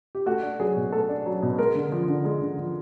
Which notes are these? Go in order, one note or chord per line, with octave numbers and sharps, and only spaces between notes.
G4
A3 F#4
D4
F#3 G#4
B2
A3 A4
D4
F#3
B2
G#3 A#4
D3
F3
D3
G#3
D3
F3